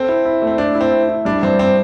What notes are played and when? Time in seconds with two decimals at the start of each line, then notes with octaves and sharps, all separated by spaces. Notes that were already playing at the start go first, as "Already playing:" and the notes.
Already playing: C4 A4
0.09 E4
0.26 E4
0.42 A3
0.47 C4
0.58 D4 E4
0.75 E4
0.81 C4
0.92 E4
1.09 E4
1.25 G3 D4
1.43 G2 C4
1.59 C4